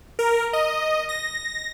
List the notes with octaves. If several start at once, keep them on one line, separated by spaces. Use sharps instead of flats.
A#4
D#5
A#6